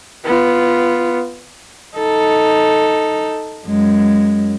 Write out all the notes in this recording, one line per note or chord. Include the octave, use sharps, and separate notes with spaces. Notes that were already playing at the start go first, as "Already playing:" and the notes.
B3 F4
D#4 A4
F#2 G#3